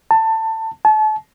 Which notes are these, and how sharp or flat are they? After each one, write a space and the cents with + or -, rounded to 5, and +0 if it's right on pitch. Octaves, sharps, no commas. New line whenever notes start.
A5 +20
A5 -35